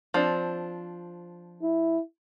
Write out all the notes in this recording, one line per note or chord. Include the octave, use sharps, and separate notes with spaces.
F3 C4 D4
E4